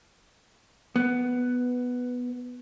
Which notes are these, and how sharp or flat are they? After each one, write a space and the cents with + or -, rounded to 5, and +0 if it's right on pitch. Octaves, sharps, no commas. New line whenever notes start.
B3 +0